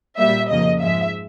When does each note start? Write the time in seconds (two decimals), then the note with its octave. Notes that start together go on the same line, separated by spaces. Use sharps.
0.18 A#2 G3 A#3 E5
0.50 F2 C#3 F3 A#3 D#5
0.82 G#2 F3 G#3 E5